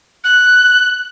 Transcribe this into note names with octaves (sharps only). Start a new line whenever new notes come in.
F#6